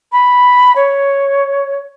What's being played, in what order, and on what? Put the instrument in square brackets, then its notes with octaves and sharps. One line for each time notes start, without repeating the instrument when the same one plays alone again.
[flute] B5
C#5